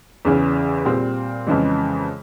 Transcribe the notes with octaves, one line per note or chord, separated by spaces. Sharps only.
E2 C#3 E3
A#2 G3 C4
F2 C#3 E3 G#3